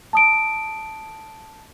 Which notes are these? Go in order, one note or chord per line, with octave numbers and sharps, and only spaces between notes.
A5 D#6 D7